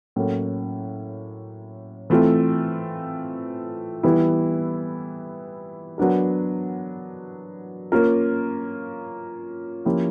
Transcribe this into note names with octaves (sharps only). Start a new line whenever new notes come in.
A2 F#3 A#3 C#4
E3 A3 C4 F4 A4
E3 G3 B3 E4
F#3 B3 D4 F#4 A#4
A#3 C#4 F4 A#4
F3 A#3 C#4 E4 G4